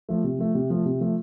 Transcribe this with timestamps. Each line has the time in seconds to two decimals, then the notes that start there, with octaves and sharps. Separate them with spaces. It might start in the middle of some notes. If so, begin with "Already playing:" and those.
0.09 F3 A3
0.24 C3
0.38 F3 A3
0.55 C3
0.70 F3 A3
0.85 C3
1.00 F3 A3